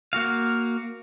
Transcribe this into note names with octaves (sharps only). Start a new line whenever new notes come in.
A#3 F#4 F5